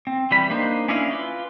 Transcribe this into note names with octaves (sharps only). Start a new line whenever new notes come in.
C4
E3 G3 B5
A#3 D4 D#4 B4 C5
C#4 D4 E4 D#5 F5
F4 B4